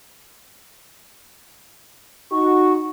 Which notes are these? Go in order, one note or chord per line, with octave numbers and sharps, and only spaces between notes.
D#4 F#4 C#6